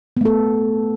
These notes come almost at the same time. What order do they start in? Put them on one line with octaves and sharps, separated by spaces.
B3 A3 A4